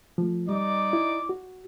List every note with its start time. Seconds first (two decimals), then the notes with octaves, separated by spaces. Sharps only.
0.18 F3 A3
0.49 G3 D#4 D5 D6
0.93 E4
1.29 F#4